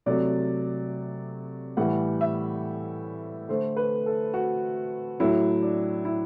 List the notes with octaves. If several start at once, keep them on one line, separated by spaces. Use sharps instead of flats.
C3 F#3 A3 D5
A2 E3 G3 F#5
E5
D3 A3 C5
B4
A4
F#4
A2 F#3 A3 E4
D4
E4